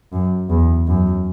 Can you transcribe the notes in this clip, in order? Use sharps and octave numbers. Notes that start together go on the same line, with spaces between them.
F#2
E2
F#2